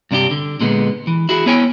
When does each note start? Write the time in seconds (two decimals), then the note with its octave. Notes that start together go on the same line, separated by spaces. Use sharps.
0.11 G2 C3 D4 E4 G4
0.31 D3
0.60 A#2 D3 G#3 B3
1.07 E3
1.29 E4 F#4 G#4
1.46 B3 E4 C#5 G5 G#5